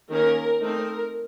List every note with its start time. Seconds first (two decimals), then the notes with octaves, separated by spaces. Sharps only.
0.11 D#3 A#3 C#4 A#4
0.61 A3 C4 D#4 A#4